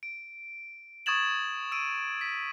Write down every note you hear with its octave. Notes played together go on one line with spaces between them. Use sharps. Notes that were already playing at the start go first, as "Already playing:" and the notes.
D7
C#6 D#6 G#6 A6 E7 F#7
E6 D7 D#7
B6